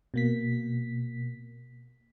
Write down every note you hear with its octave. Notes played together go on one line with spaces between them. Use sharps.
B2 A#3 B6